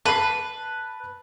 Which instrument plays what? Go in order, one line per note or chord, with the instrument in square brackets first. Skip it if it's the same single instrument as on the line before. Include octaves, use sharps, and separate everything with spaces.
[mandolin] B4 [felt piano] A5 B5 C7